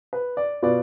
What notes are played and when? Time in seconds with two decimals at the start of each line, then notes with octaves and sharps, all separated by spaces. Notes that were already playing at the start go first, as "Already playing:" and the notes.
0.13 B4
0.37 D5
0.62 B2 B3 F4 D5